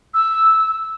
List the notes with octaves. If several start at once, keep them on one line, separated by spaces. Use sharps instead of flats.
E6